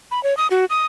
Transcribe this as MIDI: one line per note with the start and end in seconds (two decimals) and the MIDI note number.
0.11 0.22 83
0.23 0.36 73
0.37 0.47 87
0.51 0.65 66
0.70 0.86 87